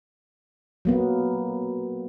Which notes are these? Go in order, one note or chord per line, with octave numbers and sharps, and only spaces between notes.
F#3 A#3 B3